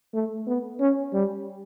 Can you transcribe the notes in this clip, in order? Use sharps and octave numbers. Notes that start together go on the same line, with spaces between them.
A3
B3
C#4
G3